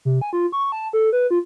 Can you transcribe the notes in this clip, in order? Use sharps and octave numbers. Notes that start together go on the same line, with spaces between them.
C3
G#5
F4
C#6
A5
A4
B4
F4